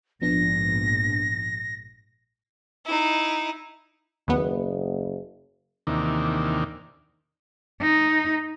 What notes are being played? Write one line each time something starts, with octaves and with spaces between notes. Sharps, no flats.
A#1 G#2 F3 B3 D4 A#6
D#4 E4
F#1 D#2 B3
D#2 C3 D#3 E3 A#3 D4
D#4